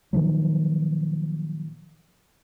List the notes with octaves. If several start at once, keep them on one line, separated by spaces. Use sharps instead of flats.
A#2 D#3 F3 F#3